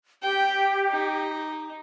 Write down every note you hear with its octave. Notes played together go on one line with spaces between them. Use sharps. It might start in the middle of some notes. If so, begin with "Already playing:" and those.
G4 G5
D#4